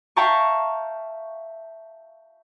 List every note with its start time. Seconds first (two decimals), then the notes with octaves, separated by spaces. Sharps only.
0.16 E5 F5 G5 A5 A#5 C#6